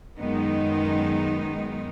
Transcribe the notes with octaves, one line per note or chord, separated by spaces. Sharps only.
F#2 D#3 G#3 B3 D#4